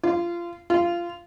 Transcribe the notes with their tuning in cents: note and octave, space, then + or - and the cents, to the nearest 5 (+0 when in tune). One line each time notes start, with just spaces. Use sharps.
F4 -25
F4 -20